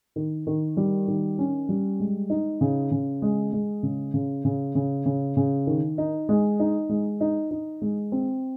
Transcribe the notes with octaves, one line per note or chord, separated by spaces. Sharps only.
D#3
D#3
G3
D#3
C#4
G3
G#3
D#4
C#3
C#3
G#3
G#3
C#3
C#3
C#3
C#3
C#3
C#3
D#3
D#4
G#3
D#4
G#3
D#4
D#4
G#3
C4